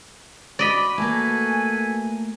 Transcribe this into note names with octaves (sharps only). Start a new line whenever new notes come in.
F#4 D5 D#5 B5
A3 A#3 A4 B4 G#5